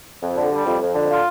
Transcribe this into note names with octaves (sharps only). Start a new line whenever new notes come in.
F2
D3
G3
F2
F2
D3
F4